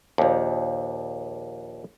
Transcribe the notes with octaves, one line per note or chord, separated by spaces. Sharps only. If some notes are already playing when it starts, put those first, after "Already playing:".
A#1 D#2